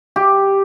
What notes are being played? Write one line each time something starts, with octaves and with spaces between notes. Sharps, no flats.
G4